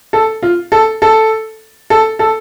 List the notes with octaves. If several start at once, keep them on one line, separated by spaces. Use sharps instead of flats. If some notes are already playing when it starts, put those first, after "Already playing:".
A4
F4
A4
A4
A4
A4